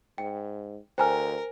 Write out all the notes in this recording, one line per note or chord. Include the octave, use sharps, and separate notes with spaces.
G#2 G5
D2 A#4 C5 G5 G#5 A#5 F6